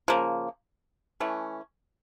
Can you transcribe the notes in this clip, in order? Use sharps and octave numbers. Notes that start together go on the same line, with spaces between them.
C#3 F3 A#3
E3 A3 C#4